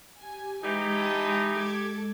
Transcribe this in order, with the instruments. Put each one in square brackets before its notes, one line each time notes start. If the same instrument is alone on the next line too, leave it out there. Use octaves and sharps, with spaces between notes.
[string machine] G4 [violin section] G#5
[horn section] E3 D#4 [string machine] G#3 [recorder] G4
[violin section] G5 A5 D#6
A4 D6 G#6